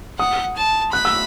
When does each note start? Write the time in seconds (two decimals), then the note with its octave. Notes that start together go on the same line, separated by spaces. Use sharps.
0.19 F#5 D#6
0.56 A5
0.93 B5 F#6
1.05 E6